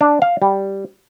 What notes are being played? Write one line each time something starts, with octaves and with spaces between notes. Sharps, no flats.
D4
F5
G3